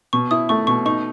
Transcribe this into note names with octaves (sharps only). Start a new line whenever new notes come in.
B2 C#6
E4 D#6
A3 C#6
B2 C#6
D#4 C#6